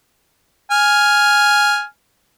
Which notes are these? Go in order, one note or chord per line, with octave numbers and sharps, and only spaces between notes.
G#5 F6